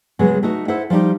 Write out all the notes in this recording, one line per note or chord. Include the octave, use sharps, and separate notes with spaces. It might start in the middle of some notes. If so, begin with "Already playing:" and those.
C#3 F#3 G#3 B3
A3 D#4 F#4
E4 A4 C5 E5 F#5
F3 G3 D#4 G4